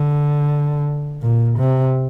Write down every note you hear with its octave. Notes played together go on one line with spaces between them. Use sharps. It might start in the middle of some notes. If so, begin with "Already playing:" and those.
Already playing: D3
A#2
C3